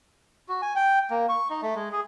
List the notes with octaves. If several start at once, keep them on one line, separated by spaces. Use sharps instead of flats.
F#4
G#5
G5
A#3
C#6
D#4
A3
G#3
G#4